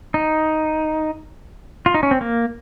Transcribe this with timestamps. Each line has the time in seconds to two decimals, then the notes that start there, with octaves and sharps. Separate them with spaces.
0.14 D#4
1.86 F4
1.94 D#4
2.03 C#4
2.11 C4
2.21 A#3